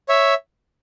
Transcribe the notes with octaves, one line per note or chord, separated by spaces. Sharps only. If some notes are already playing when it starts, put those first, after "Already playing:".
C#5 E5